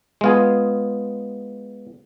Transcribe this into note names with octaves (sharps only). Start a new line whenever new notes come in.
G#3 B3 F4 G#4